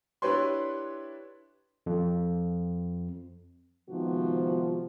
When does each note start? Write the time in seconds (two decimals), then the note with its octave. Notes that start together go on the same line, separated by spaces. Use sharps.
0.22 D4 E4 G4 B4 C#5 C6
1.86 F2
3.90 G#2 C3 D#3 F3 B3 F#4